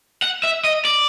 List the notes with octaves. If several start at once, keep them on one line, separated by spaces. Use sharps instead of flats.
F#5
E5
D#5
D5